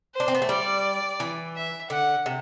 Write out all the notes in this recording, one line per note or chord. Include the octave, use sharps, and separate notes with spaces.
C5
D4
C4
B3
A3
G3 D5
E3
E5
D3 F#5
C3